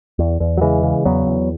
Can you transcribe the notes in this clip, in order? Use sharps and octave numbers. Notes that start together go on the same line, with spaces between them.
E2
E2
F#3
C#3 E3 G#3
C#3
E2 F#3 B3
E2